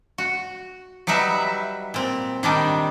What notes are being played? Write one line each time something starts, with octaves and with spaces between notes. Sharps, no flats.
F#4
F#3 G3 D#4 B4 E5
A#2 C4
D#3 G3 D4 D#4